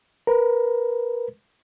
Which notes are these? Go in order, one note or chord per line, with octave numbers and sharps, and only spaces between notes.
A#4 B4